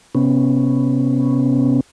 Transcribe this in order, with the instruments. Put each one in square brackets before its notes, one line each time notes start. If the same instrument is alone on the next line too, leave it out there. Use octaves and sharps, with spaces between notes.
[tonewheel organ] C3 B3 C#4